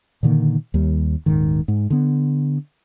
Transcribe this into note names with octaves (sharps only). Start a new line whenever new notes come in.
A#2 D3 D#3 A#3
D#2 G3
D#1 G#2 D#3
G#2
D3 B3